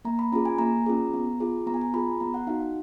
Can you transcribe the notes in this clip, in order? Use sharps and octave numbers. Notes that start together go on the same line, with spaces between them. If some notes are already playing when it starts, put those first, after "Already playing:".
A#3 A#5
B5
C#4 F4 G#4 A#5
G#5
A#3 A#5
C#4 F4 G#4
B3
F4 G#4
B3 A#5
G#5
A#5
F4 G#4 B5
B3 A#5
F#5
D#4 F#4 F5
F5